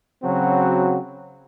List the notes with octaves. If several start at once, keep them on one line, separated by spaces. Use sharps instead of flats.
C#3 F#3 C4 F#4